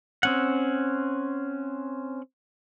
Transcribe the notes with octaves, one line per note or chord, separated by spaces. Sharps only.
C4 C#4 F#5